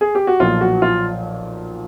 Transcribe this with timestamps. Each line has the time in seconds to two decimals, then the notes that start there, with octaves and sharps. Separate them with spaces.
0.01 G#4
0.15 G4
0.27 F#4
0.40 B1 A#2 F3 F4
0.61 F#4
0.82 F4